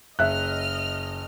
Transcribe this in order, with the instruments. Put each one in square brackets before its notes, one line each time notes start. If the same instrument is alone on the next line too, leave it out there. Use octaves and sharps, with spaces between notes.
[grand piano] F#1 [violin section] D#5 F6 [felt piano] E5 F#6